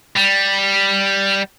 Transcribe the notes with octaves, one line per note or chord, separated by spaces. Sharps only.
G3